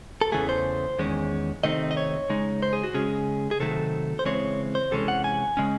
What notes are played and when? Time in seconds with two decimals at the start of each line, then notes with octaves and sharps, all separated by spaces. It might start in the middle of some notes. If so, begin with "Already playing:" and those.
0.21 A4
0.32 E2 C#3 E3 A3 G#4
0.49 C5
0.99 E2 D#3 G#3 C#4
1.64 C3 D#3 A3 C4 D#4 D#5
1.91 D#5
1.97 C#5
2.29 C#3 G#3 D#4
2.63 C5
2.73 G#4
2.83 F#4
2.94 C#3 G#3 C#4 G#4
3.51 G#4
3.60 C3 D#3 F#3 A3 A4
4.19 C5
4.25 C#3 E3 G#3 C4 C#5
4.75 C5
4.91 C3 E3 G#3 C#4 A4
5.08 F#5
5.24 G#5
5.57 C#3 G#3 C#4